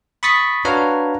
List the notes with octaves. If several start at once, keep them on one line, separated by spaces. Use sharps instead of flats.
B5 C#6 D#6 A6 B6 C#7
D4 F#4 B4 C#5 F5 A#5